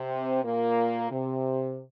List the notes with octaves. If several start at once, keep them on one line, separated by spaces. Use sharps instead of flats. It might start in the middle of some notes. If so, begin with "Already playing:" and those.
Already playing: C3 C4
A#2 A#3
C3